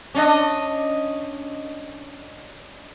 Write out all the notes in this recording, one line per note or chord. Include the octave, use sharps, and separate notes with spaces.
C#4 D4 D#5